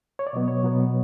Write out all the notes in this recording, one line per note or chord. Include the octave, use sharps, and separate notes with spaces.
C#5
D5
B2 F#3 B3 D#5
C#5
B2 F#3 B3